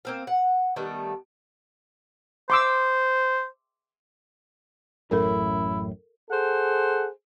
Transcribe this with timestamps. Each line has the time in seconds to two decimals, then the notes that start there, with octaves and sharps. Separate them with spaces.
0.05 A#3 C4 F5
0.27 F#5
0.76 D#3 G3 A3 B3
2.50 C5 C6 D6 E6
5.11 A1 F#2 A2 E4 A4 A#4
6.30 G#4 A4 C5 F#5